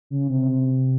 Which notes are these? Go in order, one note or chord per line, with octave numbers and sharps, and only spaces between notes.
C#3
C3